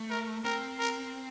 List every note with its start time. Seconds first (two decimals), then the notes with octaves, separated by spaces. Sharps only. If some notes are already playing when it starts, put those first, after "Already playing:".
Already playing: A3
0.10 A#4
0.44 C4 A#4
0.79 A#4